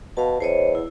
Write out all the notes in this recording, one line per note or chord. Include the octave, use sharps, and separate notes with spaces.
B2 F5 A5
E2 C5 C#5 D#5
E4